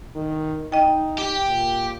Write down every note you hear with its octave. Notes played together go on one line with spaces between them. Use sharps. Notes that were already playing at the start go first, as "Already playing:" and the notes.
D#3
D#4 D#5 G5
G4
A#2